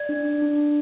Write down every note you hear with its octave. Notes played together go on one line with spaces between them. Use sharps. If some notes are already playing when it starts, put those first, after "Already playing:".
Already playing: D5 G#6
D4
D4